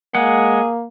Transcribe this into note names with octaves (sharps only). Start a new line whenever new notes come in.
G#3 A#3 G#4 F#5